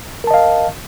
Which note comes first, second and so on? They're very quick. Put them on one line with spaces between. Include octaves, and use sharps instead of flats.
A#4 A5 D#5 F5